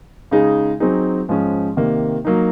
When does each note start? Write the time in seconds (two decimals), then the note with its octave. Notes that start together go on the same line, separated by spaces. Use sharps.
0.31 C#3 G#3 D#4 G#4
0.80 F#3 C4 D#4 G#4
1.29 G#2 F3 G#3 C#4
1.77 C3 D#3 A#3
2.25 F#3 A#3 D#4